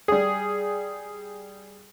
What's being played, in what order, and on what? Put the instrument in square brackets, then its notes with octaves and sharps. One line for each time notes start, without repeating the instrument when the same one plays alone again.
[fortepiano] G3 G#4